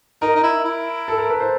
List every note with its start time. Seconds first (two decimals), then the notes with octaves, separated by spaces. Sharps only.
0.22 D#4 A#4
0.36 D#4
0.43 E4
0.65 E4
1.08 A4
1.18 A#4
1.29 B4
1.40 C5